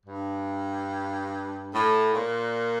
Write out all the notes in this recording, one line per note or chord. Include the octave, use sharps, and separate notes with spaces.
G2
A2
A#2